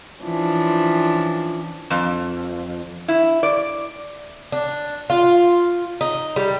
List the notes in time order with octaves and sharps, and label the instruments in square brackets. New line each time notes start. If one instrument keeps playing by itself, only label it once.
[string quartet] E3 F3 C#4 D4
[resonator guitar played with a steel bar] F2
E4
D5
[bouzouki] D4
F4
D#4
G3